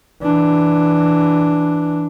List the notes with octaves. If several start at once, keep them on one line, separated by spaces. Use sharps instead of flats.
E3 D4